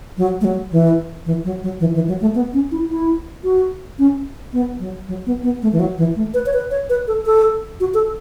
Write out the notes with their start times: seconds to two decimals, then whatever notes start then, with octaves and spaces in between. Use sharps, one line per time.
0.18 F#3
0.41 A3
0.45 F#3
0.72 E3
1.26 E3
1.45 F#3
1.63 F#3
1.80 E3
1.95 E3
2.08 F#3
2.21 A3
2.35 B3
2.54 C#4
2.71 E4
2.90 E4
3.44 F#4
3.99 C#4
4.53 B3
4.80 F#3
5.08 F#3
5.26 B3
5.44 B3
5.62 A3
5.73 E3
5.80 F#3
5.98 E3
6.16 A3
6.34 B4
6.46 C#5
6.53 B4
6.71 C#5
6.89 B4
7.08 A4
7.26 A4
7.80 F#4
7.94 A4